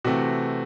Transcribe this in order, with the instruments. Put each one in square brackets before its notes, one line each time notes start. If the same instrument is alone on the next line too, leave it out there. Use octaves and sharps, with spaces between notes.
[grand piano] C3 E3 A3 C4 F#4